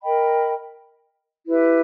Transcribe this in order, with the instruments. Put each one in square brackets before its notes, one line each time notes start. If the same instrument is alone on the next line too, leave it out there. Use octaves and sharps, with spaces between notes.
[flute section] A#4 D#5 G5 B5
E4 G4 B4 E5